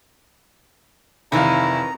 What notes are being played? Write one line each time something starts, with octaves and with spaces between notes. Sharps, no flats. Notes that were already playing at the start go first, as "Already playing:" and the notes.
F1 D#3 E3 D#4 E4 F5 A#5